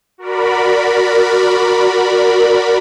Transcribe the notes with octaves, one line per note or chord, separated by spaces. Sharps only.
F#4 A#4 D5 B5